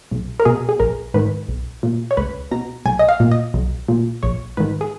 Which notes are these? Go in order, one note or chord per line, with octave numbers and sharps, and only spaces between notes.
B1
A#4
B2 G#4
G#4
A#1 A#4
G#2 D#3 B4
B1
A#2
C#5
C#2 B4
B2 A#5
B1 G#5
D#5
F5
A#2
D#5
B1
A#2
A#1 C#5
G#2 D#3 B4
G#4